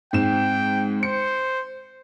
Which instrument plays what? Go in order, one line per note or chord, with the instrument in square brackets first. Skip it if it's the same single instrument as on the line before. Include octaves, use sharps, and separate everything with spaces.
[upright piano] G#2 C4 E7 [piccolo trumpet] G5
[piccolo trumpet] C5 [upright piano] C#7